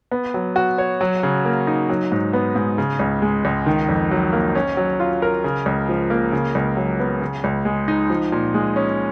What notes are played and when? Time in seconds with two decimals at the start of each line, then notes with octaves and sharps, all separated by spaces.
0.11 B3
0.34 F#3
0.56 F#4
0.78 C#5
1.01 F#3
1.23 C#3
1.45 A#3
1.67 D#4
1.90 F#3
2.12 G#2
2.33 B3
2.56 G#2
2.78 C#3
3.00 C#2
3.22 G#3
3.45 C#2
3.66 D#3
3.89 F2
4.11 F#3
4.33 A#3
4.55 C#4
4.77 F#3
5.00 F4
5.22 A#4
5.44 C#3
5.66 C#2
5.89 F3
6.10 A#3
6.32 C#3
6.55 C#2
6.77 F#3
7.00 B3
7.21 C#3
7.44 C#2
7.65 G#3
7.88 D#4
8.10 F3
8.32 A#2
8.54 G#3
8.76 C#4